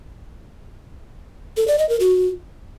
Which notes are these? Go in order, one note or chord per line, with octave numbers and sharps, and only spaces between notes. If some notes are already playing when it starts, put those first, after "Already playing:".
A4
D5
D#5
A#4
F#4